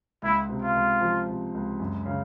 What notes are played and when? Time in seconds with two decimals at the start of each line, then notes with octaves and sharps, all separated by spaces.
0.22 C#2 E4
0.49 C3
0.62 F4
0.75 C#2
1.01 F3
1.28 C3
1.54 C#2
1.80 F#2
2.06 C#3